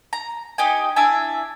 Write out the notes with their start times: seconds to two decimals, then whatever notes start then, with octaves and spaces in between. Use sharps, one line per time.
0.13 A#5
0.58 D#4 G4 D#5 G#5
0.96 D4 E4 E5 G#5